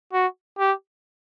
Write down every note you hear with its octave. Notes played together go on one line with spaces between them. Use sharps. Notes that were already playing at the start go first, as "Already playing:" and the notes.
F#4
G4